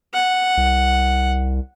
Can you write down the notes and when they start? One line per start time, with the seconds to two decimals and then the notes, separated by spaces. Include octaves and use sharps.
0.14 F#5
0.57 C2